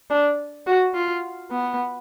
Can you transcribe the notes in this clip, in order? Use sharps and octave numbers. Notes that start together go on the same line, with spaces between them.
D4
F#4
F4
B3